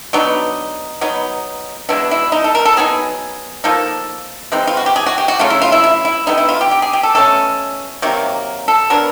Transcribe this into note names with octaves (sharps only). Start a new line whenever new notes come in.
F#3 B3 D4 D#4
F#3 B3 D#4
B2 G#3 B3 D4 E4
E4
D#4
A4
A#4
A4
F#3 B3 D#4 G#4
F3 A#3 D#4 A4
E3 G#3 C4 D#4
F4
F#4
G4
G#4
F#4
G4
F#4
C#3 F#3 A3 F4
E4
F4
E4
E4
E4
D3 G3 B3 D#4
E4
F4
G4
G4
G#4
G4
A4
B2 F#3 A3 C#4 A4
C3 D#3 F#3 A#3
A4
F#3 B3 D4 A#4